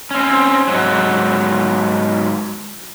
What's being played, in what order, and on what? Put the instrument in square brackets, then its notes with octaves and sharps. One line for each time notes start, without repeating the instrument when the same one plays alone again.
[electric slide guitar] C4 C#4
G#2 F#3